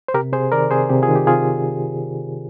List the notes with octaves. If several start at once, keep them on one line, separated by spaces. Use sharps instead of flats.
C5
C3 G4 A#4
C3 G#4 C5
D#3 A#4 D5
C3 G#4 C5
C3 G4
F4 G#4
D#3
G4
C3 F4 G#4